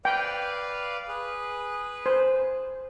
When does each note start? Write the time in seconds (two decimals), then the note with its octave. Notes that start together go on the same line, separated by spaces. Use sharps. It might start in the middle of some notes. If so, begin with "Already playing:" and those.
0.05 B4 D5 F5 G5
1.08 G#4 B4
2.06 C5